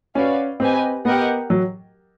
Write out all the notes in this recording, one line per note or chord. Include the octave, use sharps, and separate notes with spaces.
C#4 F#4 B4 D5 F5
C4 G4 B4 D#5 G#5
B3 G4 A#4 D#5 F#5
F#3